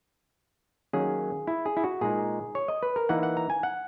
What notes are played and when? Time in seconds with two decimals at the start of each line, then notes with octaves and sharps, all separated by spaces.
0.93 D#3 F#3 A#3 C#4 G#4
1.47 E4
1.66 G#4
1.77 E4
1.84 F#4
2.01 A#2 G#3 D#4 G#4
2.55 C#5
2.68 D#5
2.83 B4
2.96 A#4
3.09 E3 A#3 D#4 F#5
3.23 F#5
3.37 A#5
3.50 G#5
3.63 F#5